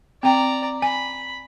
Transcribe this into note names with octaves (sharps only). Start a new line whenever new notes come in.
C4 D5 G5 A#5
G#5 B5